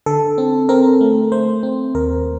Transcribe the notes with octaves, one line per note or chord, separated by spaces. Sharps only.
D3 A4
C4
C4 A#4
A3
A3 C5
C4
D#2 A#4